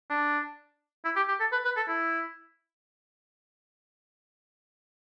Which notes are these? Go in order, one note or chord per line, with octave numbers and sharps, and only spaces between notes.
D4
E4
G4
G4
A4
B4
B4
A4
E4